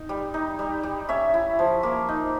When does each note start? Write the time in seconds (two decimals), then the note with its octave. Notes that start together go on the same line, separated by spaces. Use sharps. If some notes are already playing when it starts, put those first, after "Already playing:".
Already playing: D#4
0.09 G3
0.34 D#4
0.59 G3
0.83 G3
1.09 C#4 E5
1.34 E4
1.59 F3
1.83 A#3
2.09 D#4